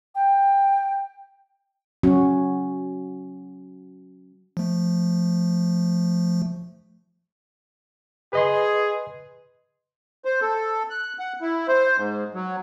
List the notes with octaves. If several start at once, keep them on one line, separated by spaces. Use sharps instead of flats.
G5
F#3 C#4 F#4
F3 A3
G#4 B4 D#5 C6
C5
A4
F#6
F#5
E4
C5
G#2
F#3